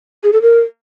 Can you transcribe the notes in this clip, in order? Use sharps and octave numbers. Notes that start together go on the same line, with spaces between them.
G#4
A4
A#4